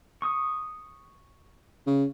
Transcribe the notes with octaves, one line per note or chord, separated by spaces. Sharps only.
C#6 D#6
C#3